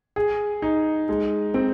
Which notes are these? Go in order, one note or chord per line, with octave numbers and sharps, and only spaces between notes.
G#4
D#4
G#3
C4